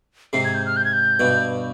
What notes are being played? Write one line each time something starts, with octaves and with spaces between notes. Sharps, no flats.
G#2 C3 C7
G#6
G6
F6
G6
G#6
G6
G2 B2